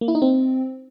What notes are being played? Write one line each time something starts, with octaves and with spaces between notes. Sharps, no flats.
A#3
E4
D#4
C4